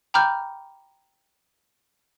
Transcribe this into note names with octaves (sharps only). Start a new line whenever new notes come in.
G5 A#5 B5 D6 F6 G6